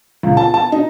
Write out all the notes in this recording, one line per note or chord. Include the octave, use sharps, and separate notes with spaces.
C#2
A5
A5
D#4